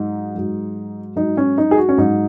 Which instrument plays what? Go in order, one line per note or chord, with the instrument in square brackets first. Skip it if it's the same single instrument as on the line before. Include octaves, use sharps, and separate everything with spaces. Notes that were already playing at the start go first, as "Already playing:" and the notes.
Already playing: [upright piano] G#2 F#3 D#4
G#2 F#3
G#2 F#3 D#4
C#4
D#4
G#4
F#4
C#4
G#2 F#3 D#4